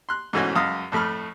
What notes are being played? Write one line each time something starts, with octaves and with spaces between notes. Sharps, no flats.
C6 F#6
G#2 B2 E3 A3 C#4 F#4
C#2 F#2 F5 D#6
F2 A2 A3 B5 F6